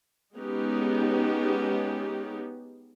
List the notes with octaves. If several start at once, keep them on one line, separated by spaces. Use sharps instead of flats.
G#3 B3 C#4 D#4 G4